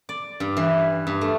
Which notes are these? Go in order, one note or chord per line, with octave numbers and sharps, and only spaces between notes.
D5
G2
E3
G2
A3